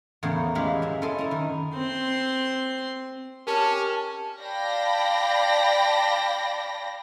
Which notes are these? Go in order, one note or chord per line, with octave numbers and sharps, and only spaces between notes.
E2 A2 C#3 A#4 C#5 G5
E3 G#3 G4 G#4 F5 B5
F#2 E5
C#4 E4 A4 D#5 C6
E4 A#5
D#3
C4 C6
C#4 G4 A#4 A5
D5 F5 G5 A5 B5 A#6